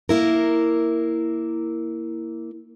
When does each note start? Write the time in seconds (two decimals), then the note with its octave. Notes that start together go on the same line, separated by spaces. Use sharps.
0.09 A#3 E4 A#4